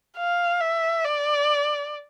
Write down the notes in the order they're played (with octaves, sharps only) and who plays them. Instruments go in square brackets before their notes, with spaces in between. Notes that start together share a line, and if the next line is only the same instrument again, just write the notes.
[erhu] F5
E5
D5